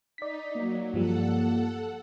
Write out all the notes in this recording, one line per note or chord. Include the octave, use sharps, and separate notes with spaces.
D#4 D5 B6
F#3 A#3
G2 F3 G3 A4 F#5